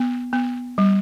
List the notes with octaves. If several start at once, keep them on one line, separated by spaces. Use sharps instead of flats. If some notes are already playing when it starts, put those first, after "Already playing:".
Already playing: B3
B3
G3